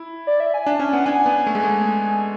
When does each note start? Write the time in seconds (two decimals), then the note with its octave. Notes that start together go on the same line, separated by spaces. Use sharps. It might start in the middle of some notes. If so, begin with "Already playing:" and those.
Already playing: E4
0.27 D5
0.40 E5
0.54 G#5
0.66 D4 A5
0.79 C#4 G#5
0.93 B3 F#5
1.05 D4 G#5
1.26 B3
1.47 A3
1.55 G#3
1.63 A3